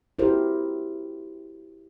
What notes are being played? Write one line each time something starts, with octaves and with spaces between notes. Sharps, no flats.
E4 F#4 G4 A#4 C5